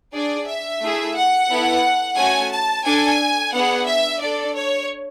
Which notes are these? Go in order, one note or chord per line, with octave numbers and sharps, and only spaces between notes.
D4 G#4 D5
E5
A3 E4 G#4
F#5
B3 E4 A4
A3 C#4 F#4 G#5
A5
D4 A4 G#5
B3 D4 G#4 F#5
E5
D4 A4 D5
C#5